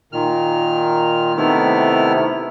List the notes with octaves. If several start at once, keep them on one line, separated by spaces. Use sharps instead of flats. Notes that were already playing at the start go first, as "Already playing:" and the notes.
A#2 D#3 F6
C3 D#3 A3 B3 E4 F6